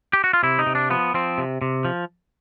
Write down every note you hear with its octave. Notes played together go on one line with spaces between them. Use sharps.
G4
F#4
F4
C3 E4
D#4
C3
D4
F3 B3
F3 C4
C3
C3
F3